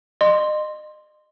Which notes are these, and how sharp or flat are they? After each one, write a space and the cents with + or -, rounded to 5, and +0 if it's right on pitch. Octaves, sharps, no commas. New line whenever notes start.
D#5 -35 C6 +0